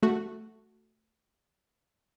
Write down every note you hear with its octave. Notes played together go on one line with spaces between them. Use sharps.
A3 F#4